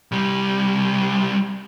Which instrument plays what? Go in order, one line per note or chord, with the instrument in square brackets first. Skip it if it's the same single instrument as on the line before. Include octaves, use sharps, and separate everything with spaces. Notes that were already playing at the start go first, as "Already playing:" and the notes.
[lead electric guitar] C2 G3